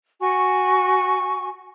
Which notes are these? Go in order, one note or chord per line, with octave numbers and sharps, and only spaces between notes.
F#4 G#5 C#6